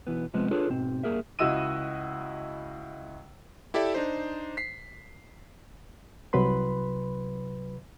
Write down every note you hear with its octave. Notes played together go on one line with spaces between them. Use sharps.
B1 E3 B3
C3 F3 G#3 B3 C4
D4 F4 G#4 A4 B4 C#5
G#2 B2 C4
G2 C3 A#3 G#4 A#4 E5
C#2 E4 F#4 D#5 E6 D#7
E4 G4 A4 D5 E5
D4 D#4 C5
B6 C7
C2 C3 F#3 B4 B5 C6